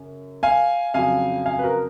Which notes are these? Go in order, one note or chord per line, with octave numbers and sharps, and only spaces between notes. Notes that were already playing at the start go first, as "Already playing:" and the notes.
Already playing: F#2 C#3
F5 G#5
F2 C#3 F#3 F5 G#5
F5 G#5
B4
F#4 A#4